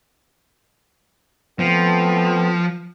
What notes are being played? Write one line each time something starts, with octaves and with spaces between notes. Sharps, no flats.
F3 A3 B3 C4